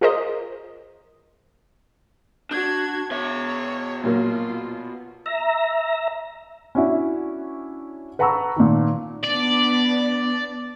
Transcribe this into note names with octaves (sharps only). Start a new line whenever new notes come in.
F4 G#4 A#4 C5 D#5
D4 F#4 G#6
B2 C#5 E5
A#2 F#3 A#3 F4
E5 A#5
C#4 D4 E4 F#4
B4 F#5 A5 A#5 C#6 E6
A#2 D#3
B3 D4 D5